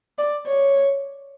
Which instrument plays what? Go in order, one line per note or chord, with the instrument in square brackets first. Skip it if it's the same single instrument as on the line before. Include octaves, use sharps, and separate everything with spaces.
[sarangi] D5
C#5